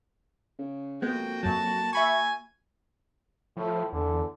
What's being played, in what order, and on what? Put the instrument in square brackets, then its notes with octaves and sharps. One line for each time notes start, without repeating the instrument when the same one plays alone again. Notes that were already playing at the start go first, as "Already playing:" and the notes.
[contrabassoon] C#3
[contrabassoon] F2 [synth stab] G#3 B3 [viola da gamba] A#3 F#4 [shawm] G5
[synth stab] F#2 F#3 [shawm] A5
[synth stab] E5 B5 C#6 [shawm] G#5
[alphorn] A2 [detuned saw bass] F3
[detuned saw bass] E2 [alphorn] D3